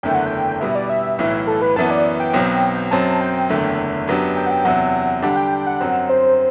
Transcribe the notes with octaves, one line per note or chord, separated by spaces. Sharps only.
F#1 E2 D3 A3 E4 G5
F#5
G5
B2 G3 B3 E4 E5
D5
E5
B1 A2 E3
A4
B4
F#2 E3 B3 A5
D5
G5
B1 B2 F#3 C4
F#2 F#3 C4 A5
G5
F#1 E2 D3 A3
F#2 F#3 B3 D4 G4
G5
F#5
G5
E2 C3 F#3 F#5
D3 G3 D4 G4 F#5
G5
G5
F#5
F#2 F#3 C4
C5